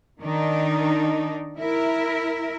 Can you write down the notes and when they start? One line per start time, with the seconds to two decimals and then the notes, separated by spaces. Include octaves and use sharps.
0.21 D#3 D4 D#4
1.59 E4 A#4 E5